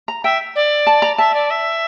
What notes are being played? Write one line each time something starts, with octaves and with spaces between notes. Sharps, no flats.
A#5
E5 G5
D5
A5
A#5
E5 A5
D5
E5